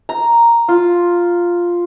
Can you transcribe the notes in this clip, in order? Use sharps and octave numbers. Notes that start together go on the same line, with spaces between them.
A#5
F4